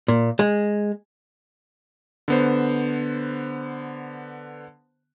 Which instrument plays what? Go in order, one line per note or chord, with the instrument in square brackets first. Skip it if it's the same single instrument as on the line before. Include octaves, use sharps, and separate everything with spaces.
[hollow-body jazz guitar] A#2
G#3
[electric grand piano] D3 B3 C5